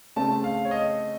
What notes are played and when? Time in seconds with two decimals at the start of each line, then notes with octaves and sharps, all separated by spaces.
0.16 C#3 A3 C4 A5
0.44 F5
0.65 C#5
0.71 D#5